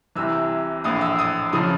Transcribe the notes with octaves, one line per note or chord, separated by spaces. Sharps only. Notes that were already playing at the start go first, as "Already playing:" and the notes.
C2 C3 E3 E6
A#1 A2 E3 D#6
E6
D#6
C#3 F3 D#6